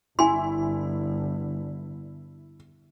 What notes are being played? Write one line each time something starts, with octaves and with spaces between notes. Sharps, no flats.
G1 E4 G#5 C6